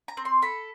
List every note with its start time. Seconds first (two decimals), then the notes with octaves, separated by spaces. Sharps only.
0.08 A#5
0.17 C4
0.25 C6
0.42 A4 B5